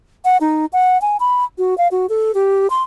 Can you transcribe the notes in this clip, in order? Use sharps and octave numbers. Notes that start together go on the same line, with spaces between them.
F#5
D#4
F#5
G#5
B5
F#4
F5
F#4
A4
G4
C6